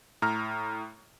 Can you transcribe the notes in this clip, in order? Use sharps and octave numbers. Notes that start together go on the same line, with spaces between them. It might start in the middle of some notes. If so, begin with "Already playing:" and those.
A2 A#5 F6